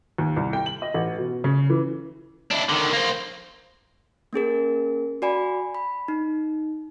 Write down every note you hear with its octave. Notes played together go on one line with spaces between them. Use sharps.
D#2
C2
G5
F#7
D#5
A1
B2
C#3
E3
D4 E4
D3 D#3
A#3 C5
A#3 C#4 G#4 A#4
F#4 D5 G#5 B5
B5
D#4